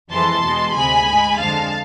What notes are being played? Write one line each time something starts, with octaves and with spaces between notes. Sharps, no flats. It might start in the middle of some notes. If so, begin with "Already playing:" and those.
F2 E3 G#3 A5 C6
E2 B2 G#3
D2 C3 G#3 G#5 B5
G#2 G#3
F2 D3 G#3 F5 A5